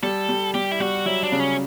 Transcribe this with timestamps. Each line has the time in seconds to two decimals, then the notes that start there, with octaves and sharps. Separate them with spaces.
0.03 G3 A4
0.29 G3
0.54 G3 G4
0.72 E4
0.80 G3 F#4
1.06 F#3 E4
1.23 D4
1.32 C#3
1.40 C#4